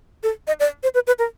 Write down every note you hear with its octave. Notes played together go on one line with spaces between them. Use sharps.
A4
D#5
D5
C5
B4
B4
A#4